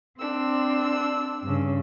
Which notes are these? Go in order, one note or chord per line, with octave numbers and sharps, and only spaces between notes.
C4 D4 E6
G2 C#3